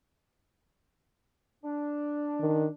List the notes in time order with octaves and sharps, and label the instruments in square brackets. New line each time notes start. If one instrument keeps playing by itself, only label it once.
[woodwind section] D4
[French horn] D#3